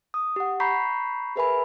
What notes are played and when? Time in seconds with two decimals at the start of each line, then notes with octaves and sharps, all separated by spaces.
0.14 D#6
0.36 G4 F#5
0.60 A#5 B5 C#6 G6 B6 C7
1.36 G#4 A#4 B4 E5 G#5 B5